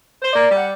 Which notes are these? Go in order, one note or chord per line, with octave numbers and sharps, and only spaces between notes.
C5
A#3 D5
G3
F#5